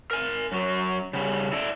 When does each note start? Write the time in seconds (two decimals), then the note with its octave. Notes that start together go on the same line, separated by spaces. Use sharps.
0.11 A#4 G#5
0.52 F#2 F#3
1.13 C#3 G3
1.53 E4 A4 D5